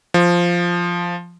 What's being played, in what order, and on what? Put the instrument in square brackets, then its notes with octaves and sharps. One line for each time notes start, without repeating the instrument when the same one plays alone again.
[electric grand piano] F3